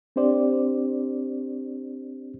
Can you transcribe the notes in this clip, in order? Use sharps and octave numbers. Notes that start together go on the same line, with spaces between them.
C4 D4 G4 C5 D5